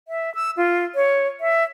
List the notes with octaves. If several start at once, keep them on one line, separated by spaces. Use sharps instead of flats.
E5
E6
F4
C#5
E5